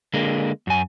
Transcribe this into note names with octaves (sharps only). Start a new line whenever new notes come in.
D3 G#3 A#3
F#2 G#5